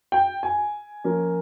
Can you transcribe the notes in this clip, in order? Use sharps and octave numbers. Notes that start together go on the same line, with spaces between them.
G5
G#5
F3 A#3 C#4